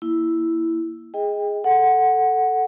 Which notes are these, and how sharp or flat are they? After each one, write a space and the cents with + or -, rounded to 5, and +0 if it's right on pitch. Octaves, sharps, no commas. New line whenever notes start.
A#3 +5 E4 +0
G#4 +0 D#5 +15 G5 +25
A4 +0 F#5 +0